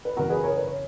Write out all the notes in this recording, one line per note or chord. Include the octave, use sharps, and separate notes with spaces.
B4
F#2 C#3 E3 F#4 A#4
G#4 B4
A#4 C#5
B4
C#5